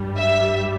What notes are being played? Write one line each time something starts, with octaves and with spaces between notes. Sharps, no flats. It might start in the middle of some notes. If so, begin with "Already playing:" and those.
Already playing: G2 G3
E5